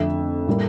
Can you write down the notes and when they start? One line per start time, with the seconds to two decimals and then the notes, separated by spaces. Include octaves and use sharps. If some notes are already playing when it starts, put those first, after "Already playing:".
Already playing: F2 D3 A3 E5
0.47 A2 G3 A#3